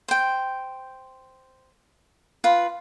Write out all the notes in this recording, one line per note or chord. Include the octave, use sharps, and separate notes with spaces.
C5 G5
F4 B4